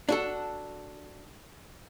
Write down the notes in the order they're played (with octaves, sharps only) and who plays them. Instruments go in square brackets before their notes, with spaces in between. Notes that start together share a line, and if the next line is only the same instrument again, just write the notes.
[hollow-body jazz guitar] D4 F#4 A4